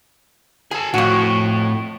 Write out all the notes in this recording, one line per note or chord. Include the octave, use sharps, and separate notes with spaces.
G#4 G#5 A5
F2 A2 F#4